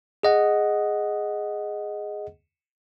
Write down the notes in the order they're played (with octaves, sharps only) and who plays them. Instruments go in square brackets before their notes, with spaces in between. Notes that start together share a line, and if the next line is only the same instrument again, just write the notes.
[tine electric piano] G#4 D#5 F#5